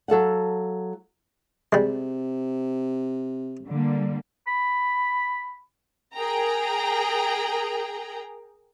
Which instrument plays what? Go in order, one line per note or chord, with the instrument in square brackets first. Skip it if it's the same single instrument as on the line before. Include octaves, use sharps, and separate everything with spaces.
[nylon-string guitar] F#3 A4 F5 F#5
[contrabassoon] C3 [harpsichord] G3 G#3
[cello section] D3 G3 A#3
[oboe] B5
[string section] G#4 A#4 G5 A#5